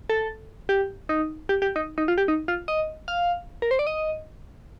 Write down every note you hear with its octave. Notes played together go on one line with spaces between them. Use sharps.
A4
G4
D#4
G4
G4
D#4
D#4
F4
G4
D#4
F4
D#5
F5
A#4
C5
D5
D#5